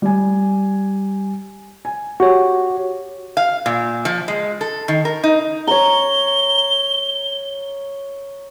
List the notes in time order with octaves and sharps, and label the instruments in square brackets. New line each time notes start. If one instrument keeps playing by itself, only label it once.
[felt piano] G3 G#5
G#5
[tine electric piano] F#4 C#5 [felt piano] G4
[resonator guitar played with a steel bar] F5
A#2
F3
G#3
A4
D#3
A#4
D#4
[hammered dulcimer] C#5 A#5 [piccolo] G7